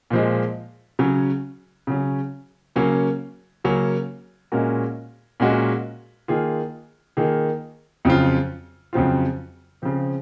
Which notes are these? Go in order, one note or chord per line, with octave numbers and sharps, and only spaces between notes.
A#2 F3 G#3
C#3 F#3 C#4
C#3 F#3 C#4
C#3 F#3 A#3 C#4
C#3 F#3 A#3 C#4
A#2 G#3 C#4 F#4 A#4
A#2 G#3 C#4 F#4 A#4
D#3 A#3 F4 G#4
D#3 A#3 F4 G#4
F2 C#3 F#3 C4 F4
F2 C#3 F#3 C4 F4
C#3 F3 C4